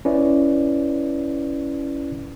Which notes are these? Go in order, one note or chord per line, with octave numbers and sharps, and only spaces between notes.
C#4 E4 B4 D5